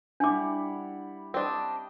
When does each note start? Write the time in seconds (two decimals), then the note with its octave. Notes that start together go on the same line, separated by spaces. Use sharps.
0.20 G3 D4 E4 F#5 D6
1.34 C4 D4 G4 D#5